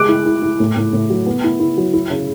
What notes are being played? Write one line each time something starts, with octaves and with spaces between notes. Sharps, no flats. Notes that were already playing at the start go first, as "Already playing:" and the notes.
Already playing: G#3 D6 F#6
E4
E4
E4
A2
A2
A2
F#3
B3
E4
E4
F#3
E4
C#3